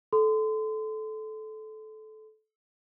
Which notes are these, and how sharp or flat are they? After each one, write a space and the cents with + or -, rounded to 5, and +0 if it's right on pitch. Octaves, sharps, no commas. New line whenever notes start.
A4 -20 C6 -35